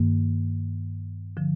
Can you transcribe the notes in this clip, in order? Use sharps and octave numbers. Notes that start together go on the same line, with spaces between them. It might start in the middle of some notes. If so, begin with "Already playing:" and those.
Already playing: G2 D#3 A#3
D3 F3